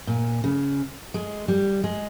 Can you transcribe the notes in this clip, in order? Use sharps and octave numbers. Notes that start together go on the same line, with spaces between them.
A#2
C#3
G#3
G3
G#3